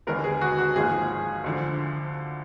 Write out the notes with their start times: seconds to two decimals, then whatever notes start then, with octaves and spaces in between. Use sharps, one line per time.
0.07 D#2 D3 G#3 B3 A#4
0.24 G#4
0.41 F#4
0.58 F#4
0.76 G#1 G#2 F3 A#3 G#4
1.44 D2 D3 F3